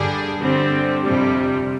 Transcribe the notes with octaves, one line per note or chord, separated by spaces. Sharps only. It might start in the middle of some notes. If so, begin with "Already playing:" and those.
Already playing: G2 D3 G3 D4 G#4
D3 G3 C4
F2 C3 G3